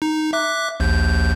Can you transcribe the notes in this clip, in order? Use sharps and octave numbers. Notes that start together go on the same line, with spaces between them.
D#4
E5 D6 F#6
A#1 D#2 G6